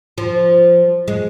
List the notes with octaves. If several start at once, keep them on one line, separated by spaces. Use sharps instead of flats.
F3
G#3